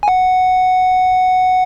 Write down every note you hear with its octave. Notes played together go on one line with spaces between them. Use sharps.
G#5
F#5